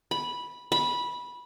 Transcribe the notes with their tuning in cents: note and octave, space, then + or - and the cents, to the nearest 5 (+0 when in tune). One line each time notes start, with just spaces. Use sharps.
B5 -10
B5 -15